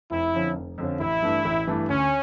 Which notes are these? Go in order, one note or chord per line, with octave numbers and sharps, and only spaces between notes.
F1 E4
F2 D3 F3 C#4
F1
F2 D3 F3 C#4
A1 E4
G2 E3 A3 D4
A1
G2 E3 A3 D4
D2 C#4